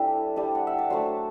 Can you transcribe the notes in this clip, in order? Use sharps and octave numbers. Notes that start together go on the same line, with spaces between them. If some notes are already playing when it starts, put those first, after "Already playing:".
Already playing: G3 C4 D4 E4 G4 A4 D5 E5
G3 D4
F#5
E5
D5
F#3 A3 D4 C5